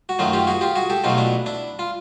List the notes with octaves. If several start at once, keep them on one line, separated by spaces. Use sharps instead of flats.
F#4
F#2 D#3 F#3 A3 D#4 F4
F4 G4
F#4 G#4
F4 G4
F#4 G#4
G4 A4
B2 F#3 A3 D#4 F4
D4 E4
D4 E4
F4